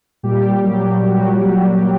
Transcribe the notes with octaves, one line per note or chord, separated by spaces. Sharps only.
A#2 G3 G4
F#3
A#2 F#3 F#4
F#3